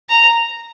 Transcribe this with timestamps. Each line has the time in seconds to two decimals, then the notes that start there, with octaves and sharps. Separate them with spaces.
0.09 A#5